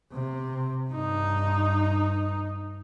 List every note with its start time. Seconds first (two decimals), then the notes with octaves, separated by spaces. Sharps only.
0.13 C3
0.90 G2 D#4